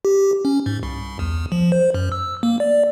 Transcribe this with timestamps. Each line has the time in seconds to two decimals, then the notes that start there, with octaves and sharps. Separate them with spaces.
0.05 G4
0.45 C#4
0.66 G#2
0.83 C2
1.19 E2
1.52 F3
1.72 C5
1.94 F#2
2.12 E6
2.43 A#3
2.60 D5